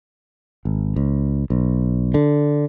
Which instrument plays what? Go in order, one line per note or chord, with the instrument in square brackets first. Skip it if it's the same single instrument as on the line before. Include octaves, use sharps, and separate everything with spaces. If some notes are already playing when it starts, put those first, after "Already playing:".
[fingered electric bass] G#1
C#2
B1
D3